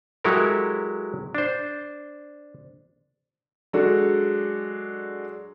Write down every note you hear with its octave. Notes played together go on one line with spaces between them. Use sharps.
F#3 G#3 E4 G4 A4 A#4
D4 C5
F#3 G#3 D4 F#4 A4